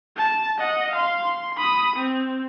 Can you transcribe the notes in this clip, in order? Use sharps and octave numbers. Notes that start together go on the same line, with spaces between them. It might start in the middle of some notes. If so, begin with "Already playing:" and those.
A5
D#5 F#5
F5 C6
C6
B5 D#6
C4